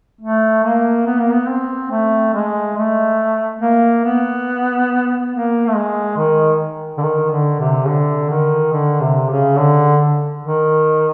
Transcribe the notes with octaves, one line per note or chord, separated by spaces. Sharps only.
A3
A#3
B3
A#3
B3
C4
A3
G#3
A3
A#3
B3
A#3
A3
G#3
D#3
D3
D#3
D3
C3
D3
D#3
D3
C3
C#3
D3
D#3